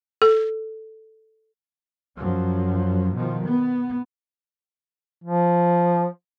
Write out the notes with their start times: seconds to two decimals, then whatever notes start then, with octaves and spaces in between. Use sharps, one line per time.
0.22 A4
2.18 F#2 F3 F#3
3.14 B2 D#3 F3
3.44 B3
5.24 F3